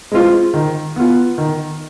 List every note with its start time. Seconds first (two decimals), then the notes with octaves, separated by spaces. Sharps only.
0.12 G#3 C4 F4
0.54 D#3
0.96 B3 F4
1.38 D#3